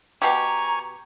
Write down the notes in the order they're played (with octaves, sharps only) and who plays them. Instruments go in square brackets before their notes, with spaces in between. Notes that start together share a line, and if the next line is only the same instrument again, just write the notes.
[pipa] B2 G4 [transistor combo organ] G#5 C#6 [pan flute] A#5